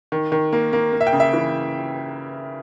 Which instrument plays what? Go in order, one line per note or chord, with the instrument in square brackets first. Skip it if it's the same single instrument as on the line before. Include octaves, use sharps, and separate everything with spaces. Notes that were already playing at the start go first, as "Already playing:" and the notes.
[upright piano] D#3
D#3
A#3
A#3
A#3
E5
G5
C#3
E5
E3